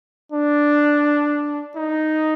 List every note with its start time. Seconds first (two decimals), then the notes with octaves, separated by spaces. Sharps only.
0.32 D4
1.76 D#4